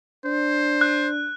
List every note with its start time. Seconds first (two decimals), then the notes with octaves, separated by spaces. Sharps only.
0.25 D4 C5
0.81 F#6